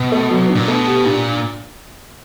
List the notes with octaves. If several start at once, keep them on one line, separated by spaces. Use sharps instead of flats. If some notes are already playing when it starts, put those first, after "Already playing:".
Already playing: B2
A3
F#3
D4
A#2
B2 A3
G4
A#2 D4